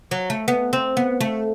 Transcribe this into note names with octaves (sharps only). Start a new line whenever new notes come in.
F#3
A3
B3
C4
B3
A3